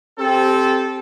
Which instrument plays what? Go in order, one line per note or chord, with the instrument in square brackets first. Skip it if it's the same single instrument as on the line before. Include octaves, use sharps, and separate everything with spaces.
[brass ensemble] C4 G4 A4